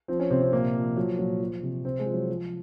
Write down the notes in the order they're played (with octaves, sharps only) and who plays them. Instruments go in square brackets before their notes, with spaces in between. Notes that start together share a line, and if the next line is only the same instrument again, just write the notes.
[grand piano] F3 C4
C#4
C3 C4
C4
A#2 A#3
F3
F3 F#3
A#2 F#3
F3
C3
C3 C4
G#3
F3
F#3
F3